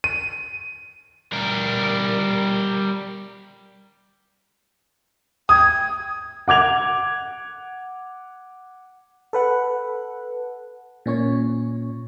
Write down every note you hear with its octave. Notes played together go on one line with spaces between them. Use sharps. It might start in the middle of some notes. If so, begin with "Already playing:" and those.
D#7
G3 A#4
G5 D#6 G#6
F#5 D6 G#6 F7
A4 B4 F#5
A#2 C#4 C#5